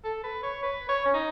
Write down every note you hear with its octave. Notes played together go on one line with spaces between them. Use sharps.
A4
B4
C#5
B4
C#5
C#4
D#4